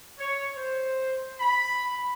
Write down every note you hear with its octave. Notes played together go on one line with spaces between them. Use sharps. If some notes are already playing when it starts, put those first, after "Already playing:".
C#5
C5
B5